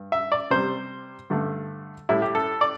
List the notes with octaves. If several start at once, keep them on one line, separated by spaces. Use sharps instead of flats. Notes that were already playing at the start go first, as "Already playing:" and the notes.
Already playing: G2
E5
D5
C3 G3 C5
G2 D3 A3
A2 G3 E4
G4
A4
D5